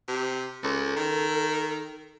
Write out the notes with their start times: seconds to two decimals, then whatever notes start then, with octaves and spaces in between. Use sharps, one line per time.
0.08 C3
0.63 C#2 A4
0.96 D#3